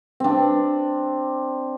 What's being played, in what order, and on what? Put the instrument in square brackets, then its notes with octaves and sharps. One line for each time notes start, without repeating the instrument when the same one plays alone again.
[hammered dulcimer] C4 D4